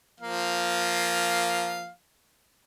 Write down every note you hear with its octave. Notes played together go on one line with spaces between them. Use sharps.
F3 A#3 F5